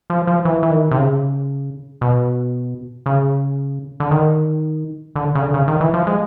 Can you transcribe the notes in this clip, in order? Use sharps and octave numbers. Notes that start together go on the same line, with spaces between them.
F3
F3
E3
E3
D#3
C3
C#3
B2
C#3
D3
D#3
D3
C#3
D3
C#3
D#3
E3
F3
G#3